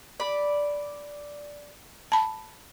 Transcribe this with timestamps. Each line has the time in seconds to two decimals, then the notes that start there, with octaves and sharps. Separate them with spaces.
0.20 D5 B5
2.12 A5 B5